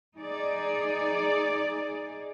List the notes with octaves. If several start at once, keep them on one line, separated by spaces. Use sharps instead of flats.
D#4 G#4 D5